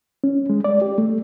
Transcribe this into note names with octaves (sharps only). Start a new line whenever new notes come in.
C#4
G#3
D5
G4
A3